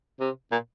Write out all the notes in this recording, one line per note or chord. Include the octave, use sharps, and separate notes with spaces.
C3
A#2